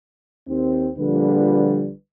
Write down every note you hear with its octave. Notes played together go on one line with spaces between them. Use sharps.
D#2 C4
A#1 D3 F3 G3 B4